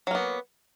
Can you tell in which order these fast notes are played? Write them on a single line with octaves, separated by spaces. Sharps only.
F#3 A#3 B3